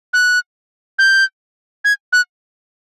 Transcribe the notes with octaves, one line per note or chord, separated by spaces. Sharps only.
F#6
G6
G#6
F#6